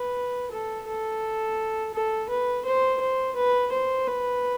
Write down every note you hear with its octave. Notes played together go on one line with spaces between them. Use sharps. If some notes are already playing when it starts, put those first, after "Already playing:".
Already playing: B4
A4
A4
A4
B4
C5
C5
B4
C5
B4